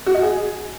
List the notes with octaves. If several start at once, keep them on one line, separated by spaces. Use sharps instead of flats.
F#4
D#5
G#4